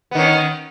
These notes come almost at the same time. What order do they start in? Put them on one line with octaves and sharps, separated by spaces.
B3 D#3 C#4